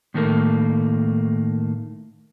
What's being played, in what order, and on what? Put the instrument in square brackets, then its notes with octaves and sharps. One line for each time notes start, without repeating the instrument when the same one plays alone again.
[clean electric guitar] A2 D#3 A3 A#3